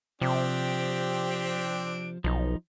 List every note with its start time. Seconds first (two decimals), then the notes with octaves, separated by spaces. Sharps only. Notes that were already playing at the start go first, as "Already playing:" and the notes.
0.21 C3 F3 C4 D4 G4
2.24 B1 F3 D#4